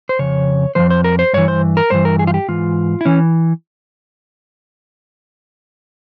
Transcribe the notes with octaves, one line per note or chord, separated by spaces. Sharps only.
C5
F2 C#3 C#5
F2 C#3 F3 C5
C5
A#4
C5
G2 E3 C#5
C5
A#4
G2 E3 C5
A#4
G#4
F4
G4
G#2 E3 F4
E4
E3 C#4